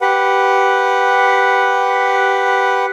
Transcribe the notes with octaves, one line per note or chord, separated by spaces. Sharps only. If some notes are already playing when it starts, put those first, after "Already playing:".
G4 B4 F#5